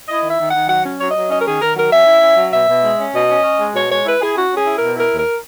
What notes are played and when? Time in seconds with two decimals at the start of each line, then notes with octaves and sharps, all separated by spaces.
0.08 E4 D#5
0.23 D#3 E5
0.39 D#3
0.49 D#3 F#5
0.68 F#3 F#5
0.85 C#4
1.00 F#3 C#5
1.10 D#5
1.15 F#3
1.30 C#4 D#5
1.39 A#4
1.45 D#3 G#4
1.60 D#3 A#4
1.76 F#3 A#4
1.91 C#4 E5
2.06 E4
2.21 C#4
2.37 F#3
2.52 B2 E5
2.68 B2
2.83 G#3
2.98 C#4
3.13 B2 D#5
3.28 C#4
3.44 C#4
3.58 G#3
3.75 B2 C#5
3.90 G#3 C#5
4.04 E4 B4
4.20 E4 G#4
4.35 C#4 F#4
4.51 C#4
4.56 G#4
4.65 E4
4.76 A#4
4.81 B2
4.96 E4 A#4
5.12 D#2
5.17 A#4